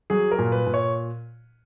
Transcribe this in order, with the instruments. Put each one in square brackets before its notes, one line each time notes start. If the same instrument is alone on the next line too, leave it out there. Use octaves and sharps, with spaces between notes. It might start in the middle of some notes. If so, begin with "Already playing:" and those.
[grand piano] F#3 G#4
A#4
A#2
B4
A#2
C#5